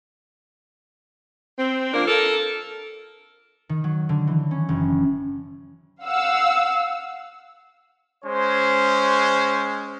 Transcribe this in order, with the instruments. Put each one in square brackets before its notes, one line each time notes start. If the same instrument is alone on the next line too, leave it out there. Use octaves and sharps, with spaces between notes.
[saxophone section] C4
F3 A#3 D4 A#4
A4 A#4
[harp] D#3
F#3
D3
E3
C#4
F#1
[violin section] F5 F#5 E6
[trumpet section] G#3 C#4 C5